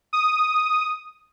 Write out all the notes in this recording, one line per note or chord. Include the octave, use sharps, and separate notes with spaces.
D#6